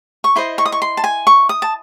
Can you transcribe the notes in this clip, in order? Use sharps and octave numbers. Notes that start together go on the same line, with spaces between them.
C#6
E4 C5 D#5 C6
C#6
D#6
C#6
C6
A5
G#5
C#6
D#6
A5